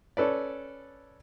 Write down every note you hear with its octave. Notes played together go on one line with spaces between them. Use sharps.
C#4 A4 B4 D5